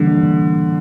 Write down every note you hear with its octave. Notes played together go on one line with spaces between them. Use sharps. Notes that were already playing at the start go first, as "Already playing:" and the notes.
Already playing: D3 E3 G3 A#3 D4